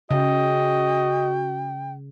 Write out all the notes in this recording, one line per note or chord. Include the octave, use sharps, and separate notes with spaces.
C#3 F#4 D#5 G5